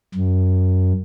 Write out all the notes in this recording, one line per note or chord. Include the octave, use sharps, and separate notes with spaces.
F#2